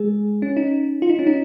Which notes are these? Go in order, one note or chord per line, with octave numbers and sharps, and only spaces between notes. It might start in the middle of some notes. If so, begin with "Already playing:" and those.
Already playing: G#3 G#4
C#4
D#4
F4
D#4
C#4
D#4